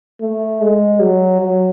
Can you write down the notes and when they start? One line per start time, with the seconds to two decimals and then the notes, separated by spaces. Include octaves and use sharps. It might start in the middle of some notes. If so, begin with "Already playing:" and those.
0.21 A3
0.61 G#3
1.00 F#3
1.40 F#3